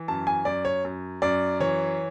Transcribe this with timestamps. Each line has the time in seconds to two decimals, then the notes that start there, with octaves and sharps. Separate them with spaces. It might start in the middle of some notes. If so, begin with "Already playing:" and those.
Already playing: E3
0.08 F#2 A5
0.27 G#5
0.45 F#2 D5
0.65 C#5
0.85 F#2
1.22 F#2 D5
1.60 E3 C#5